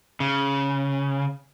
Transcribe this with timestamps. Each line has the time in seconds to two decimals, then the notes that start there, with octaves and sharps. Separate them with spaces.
0.20 C#3